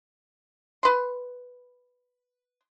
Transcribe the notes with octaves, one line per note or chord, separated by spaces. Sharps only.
B4 C6